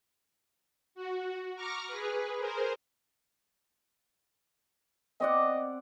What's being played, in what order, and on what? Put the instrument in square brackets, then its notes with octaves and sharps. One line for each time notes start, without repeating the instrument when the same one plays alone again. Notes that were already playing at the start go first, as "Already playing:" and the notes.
[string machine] F#4
A#5 C#6 D6 F6 A#6
G#4 B4
G#4 A#4 C5
[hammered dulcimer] C4 D5 F#5 [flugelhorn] D#5